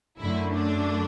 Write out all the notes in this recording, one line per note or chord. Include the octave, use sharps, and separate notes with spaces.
F#2 D3 A3 E4
D4